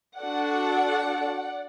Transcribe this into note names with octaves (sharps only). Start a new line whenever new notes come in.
D4 F#4 A4 D5 F#5